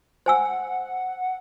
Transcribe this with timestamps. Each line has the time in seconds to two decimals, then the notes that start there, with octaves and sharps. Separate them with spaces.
0.26 C5 F#5 G#5 E6